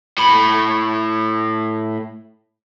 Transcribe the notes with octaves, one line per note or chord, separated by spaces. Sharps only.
A2 B5